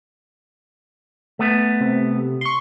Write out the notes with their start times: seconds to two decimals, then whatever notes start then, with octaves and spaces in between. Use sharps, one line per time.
1.39 A3 B3
1.81 C3
2.41 C6 C#6